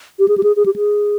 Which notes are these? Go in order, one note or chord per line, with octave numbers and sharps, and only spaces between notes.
G4
G#4
G4
G#4
G#4
G4
G#4